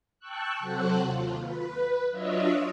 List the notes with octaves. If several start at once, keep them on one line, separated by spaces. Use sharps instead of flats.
G5 A5 C#6 E6 F#6
C3 F#3 F#4 A4 C5 F#6
D#2 F4
B4
F#3 D4 F4 C#5 D#5 E5